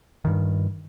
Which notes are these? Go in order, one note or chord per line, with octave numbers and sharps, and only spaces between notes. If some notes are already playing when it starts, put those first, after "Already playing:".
G2 D#3